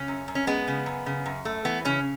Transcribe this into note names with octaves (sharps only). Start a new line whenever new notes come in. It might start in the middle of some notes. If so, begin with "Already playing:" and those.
Already playing: C#3 C#4
F#2
F#2
C#4
G#3 B3
C#3
F#2
C#3
F#2
A3
E3 B3
C#3 C#4